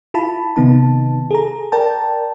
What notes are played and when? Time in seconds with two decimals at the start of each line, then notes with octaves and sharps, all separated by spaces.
0.14 E4 F4 A5 B5
0.56 C3 D#3 B3 D#4 A5
1.31 G#4 A4 A#5
1.72 A#4 D5 G5 A5 A#5